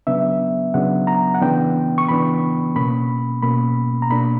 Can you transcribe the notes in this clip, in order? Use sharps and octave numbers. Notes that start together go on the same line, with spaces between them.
C#3 F#3 B3 D4 E5
C#3 F#3 B3 D4 F#5
A#5
F#5
C#3 E3 B3 D4 G5
C#6
C#3 E3 B3 D4 B5
B2 A#3 C#4 B5
B2 A#3 C#4 B5
A#5
B2 A#3 D4 B5